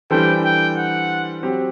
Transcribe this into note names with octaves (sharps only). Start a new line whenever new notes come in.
E3 G3 D4 A4 C5 G5
G5
F#5
F#3 C4 G4